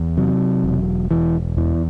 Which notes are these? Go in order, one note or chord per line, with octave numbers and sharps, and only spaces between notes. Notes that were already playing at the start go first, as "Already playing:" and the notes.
Already playing: E2
C3 F#3
E1
E1 E3
E2 E3